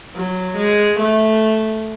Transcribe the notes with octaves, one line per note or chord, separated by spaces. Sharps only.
F#3
G#3
A3